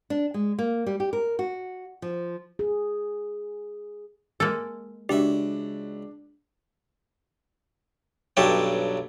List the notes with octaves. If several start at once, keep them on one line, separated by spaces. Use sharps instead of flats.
D4
G#3
A#3
G3
G4
A#4
F#4
F3
G#4
G#3 A#3 A4
C#2 D4 F#4 G4 E5
B1 G2 F#3 G4 A4 C#5